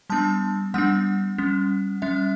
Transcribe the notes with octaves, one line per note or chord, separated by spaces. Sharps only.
G3 B3 D4 A5
G3 B3 D4 F#5
G3 C#4
G3 C#4 E5